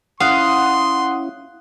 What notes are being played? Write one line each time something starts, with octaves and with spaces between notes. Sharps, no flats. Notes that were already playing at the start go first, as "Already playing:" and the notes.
C#4 E4 F5 F#5 C6 D#6 F#6